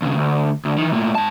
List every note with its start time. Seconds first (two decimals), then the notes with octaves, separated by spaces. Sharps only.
0.02 D#2 C#3
0.17 D2
0.65 D2
0.78 D#3 E3
0.93 A2 A#3
1.15 G#2 A5